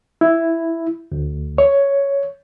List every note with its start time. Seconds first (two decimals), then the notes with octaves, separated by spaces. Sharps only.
0.21 E4
1.12 D2
1.58 C#5